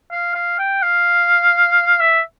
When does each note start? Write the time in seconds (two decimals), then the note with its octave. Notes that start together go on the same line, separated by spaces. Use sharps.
0.12 F5
0.35 F5
0.59 G5
0.82 F5
2.00 E5